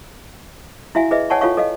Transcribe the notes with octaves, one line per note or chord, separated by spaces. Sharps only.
E4 F#4 E5 F5 G#5
G#4 B4 D#5 E5
C#5 D5 F#5 G#5 A5 C#6
F4 A4 C#5 F5 C#6
A4 D#5 F5